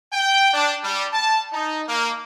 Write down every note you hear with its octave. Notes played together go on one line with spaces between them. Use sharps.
G5
D4
G3
A5
D#4
A#3